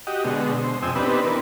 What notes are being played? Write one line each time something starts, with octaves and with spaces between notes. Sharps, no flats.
F#4 G4 D#5
B2 D3 G#3
C5
F2 C3 G5 G#5 D#6 E6
B3 C4 D4 D#4 G4 B4
E3 A#4 B4